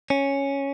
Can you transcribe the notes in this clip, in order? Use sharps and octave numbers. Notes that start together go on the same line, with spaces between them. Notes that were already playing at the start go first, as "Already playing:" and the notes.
C#4